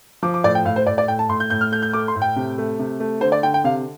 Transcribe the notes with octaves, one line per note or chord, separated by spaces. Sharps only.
F3 D6
D6
A2 D5
G5
A2 F5
C5
A2 D5
D5
A2 G5
A5
A2 C6
G6
A2 G6
F6
A3 G6
G6
A3 D6
C6
A2
G5
C3
A3
C3
A3
D3 C5
D5
D3 G5
G5
C3 F5